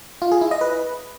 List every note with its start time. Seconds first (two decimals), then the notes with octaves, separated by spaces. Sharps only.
0.22 F4
0.32 G#4
0.41 E4
0.51 D#5
0.61 B4